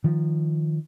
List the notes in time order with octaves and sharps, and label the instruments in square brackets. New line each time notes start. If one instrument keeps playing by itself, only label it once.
[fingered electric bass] D#3 F3